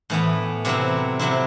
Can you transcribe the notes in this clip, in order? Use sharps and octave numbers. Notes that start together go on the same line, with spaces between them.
A2 E3 B3
C3 F#3 C4 E4
C3 F#3 C4 E4